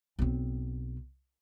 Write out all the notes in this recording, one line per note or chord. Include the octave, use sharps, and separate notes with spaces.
B1 C4